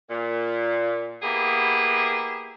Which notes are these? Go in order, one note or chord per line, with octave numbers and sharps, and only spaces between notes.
A#2
A#3 B3 E4 G4 G#4